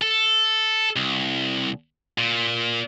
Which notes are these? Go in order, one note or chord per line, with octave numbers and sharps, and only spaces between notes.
A4
C2
A#2